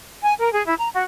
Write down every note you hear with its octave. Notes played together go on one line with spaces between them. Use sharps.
G#5
A#4
G#4
E4
A#5
F#4